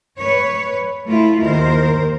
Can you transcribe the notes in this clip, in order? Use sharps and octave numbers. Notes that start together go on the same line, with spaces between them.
B4 C#5
A3 E4 F4
D#2 D#3 A#4 C5